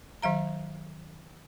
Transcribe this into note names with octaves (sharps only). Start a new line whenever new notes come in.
D#3 F#3 F5 A#5